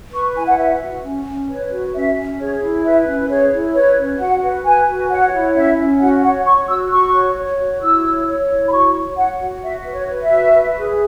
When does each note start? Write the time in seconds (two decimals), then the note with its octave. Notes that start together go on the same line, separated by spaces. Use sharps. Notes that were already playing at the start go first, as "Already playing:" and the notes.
0.12 B4 C#6
0.35 E4 G#5
0.47 F#5
0.57 B4 E5
0.81 F#4
1.03 C#4
1.26 C#4
1.48 B4 C#5
1.71 F#4
1.94 C#4 E5
2.16 C#4
2.38 G#4 C#5
2.61 E4
2.84 B4 E5
3.07 C#4
3.29 G#4 C#5
3.52 E4
3.74 B4 C#5
3.97 C#4
4.19 F#4 F#5
4.43 B4
4.65 B4 G#5
4.87 F#4
5.10 C#5 F#5
5.32 E4
5.55 C#4 E5
5.78 C#4
6.00 F#4 F#5
6.23 C#5 F#5
6.45 C#5 C#6
6.68 F#4 E6
6.91 F#4 C#6
7.14 C#5
7.36 C#5
7.59 F#4
7.81 E4 E6
8.04 C#5
8.27 C#5
8.49 E4
8.67 B5
8.71 F#4 C#6
8.94 C#5
9.17 C#5 F#5
9.40 F#4
9.62 F#4 E5
9.85 B4
9.92 C#5
10.08 B4
10.22 E5
10.29 F#4
10.53 B4
10.76 G#4